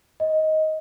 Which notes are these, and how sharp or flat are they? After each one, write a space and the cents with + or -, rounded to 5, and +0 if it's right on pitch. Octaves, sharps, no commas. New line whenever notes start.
D#5 +10